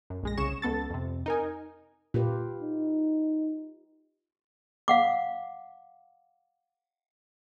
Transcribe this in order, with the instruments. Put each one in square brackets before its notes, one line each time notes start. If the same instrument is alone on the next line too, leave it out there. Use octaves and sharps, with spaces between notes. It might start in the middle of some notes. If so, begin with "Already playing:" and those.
[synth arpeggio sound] F#2
A#1 G#3 A#6
C2 C#3 G#4 C#6 E7
C#2 B3 A4 A6
F2 C3
D#4 A#4 G#5
[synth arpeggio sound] A#2 [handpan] F4 G4 B4
[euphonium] D#4
[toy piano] F5 F#5 D6